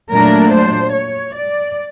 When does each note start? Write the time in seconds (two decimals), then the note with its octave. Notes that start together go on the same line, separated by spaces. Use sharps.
0.11 A#2 F#3 A3 D4 A#4
0.52 C5
0.93 C#5
1.35 D5